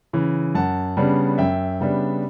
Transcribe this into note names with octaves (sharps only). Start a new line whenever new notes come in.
C#3 E3
F#2 F#5 A5
C#3 G3 B3 D4
F#2 E5 G5
C#3 G3 B3 D4